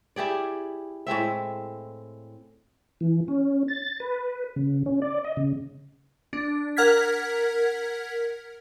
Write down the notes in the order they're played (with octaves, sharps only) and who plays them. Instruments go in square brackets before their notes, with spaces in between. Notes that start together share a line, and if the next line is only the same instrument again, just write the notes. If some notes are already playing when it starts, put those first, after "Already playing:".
[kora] E4 G4 G#4 D5
A2 G#3 C4 E5
[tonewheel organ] E3
C#4
A6
B4
C#3
C#4
D5
D#5
C#3
[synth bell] D4
A#4 F#5 F6 G#6 B6